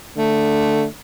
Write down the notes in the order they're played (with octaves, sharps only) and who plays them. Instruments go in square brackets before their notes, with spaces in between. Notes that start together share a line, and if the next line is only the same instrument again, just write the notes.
[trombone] D3 [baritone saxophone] A3